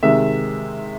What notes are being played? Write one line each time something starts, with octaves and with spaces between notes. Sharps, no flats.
C3 D#3 G#3 E5